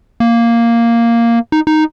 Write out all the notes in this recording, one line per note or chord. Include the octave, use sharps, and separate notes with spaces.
A#3
D#4
D#4